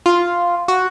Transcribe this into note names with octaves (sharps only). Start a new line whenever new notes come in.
F4
F#4